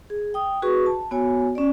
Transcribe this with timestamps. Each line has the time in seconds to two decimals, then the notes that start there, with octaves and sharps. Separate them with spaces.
0.10 G#4
0.34 G5 D#6
0.62 F#4 G#4 B4 C#6
0.86 A5
1.11 B3 F#4 C#5 G#5
1.55 C#4 D5